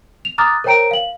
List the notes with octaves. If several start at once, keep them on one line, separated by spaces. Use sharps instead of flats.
F7
A#5 D6 D#6 F6 F#6 A6
A#4 C5 C#5 G5 A#5 D7
F5 F#7